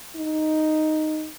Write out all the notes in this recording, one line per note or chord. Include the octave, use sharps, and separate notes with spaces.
D#4